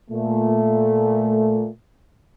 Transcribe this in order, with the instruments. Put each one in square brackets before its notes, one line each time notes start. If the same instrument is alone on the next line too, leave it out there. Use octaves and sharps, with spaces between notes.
[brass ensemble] A#2 A3